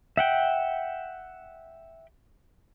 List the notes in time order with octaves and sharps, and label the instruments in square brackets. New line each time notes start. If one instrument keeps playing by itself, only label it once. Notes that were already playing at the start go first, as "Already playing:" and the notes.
[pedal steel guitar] E5 F#5 G5